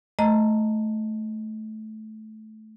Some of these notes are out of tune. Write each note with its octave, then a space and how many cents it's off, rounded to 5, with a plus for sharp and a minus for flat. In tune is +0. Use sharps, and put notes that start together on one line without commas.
A3 -15 D#5 +0 A#5 -5